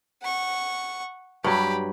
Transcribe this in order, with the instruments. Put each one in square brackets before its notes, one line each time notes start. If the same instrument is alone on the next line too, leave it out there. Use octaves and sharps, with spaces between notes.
[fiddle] F#5 C#6
[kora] G2 F#3 [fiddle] G4 B5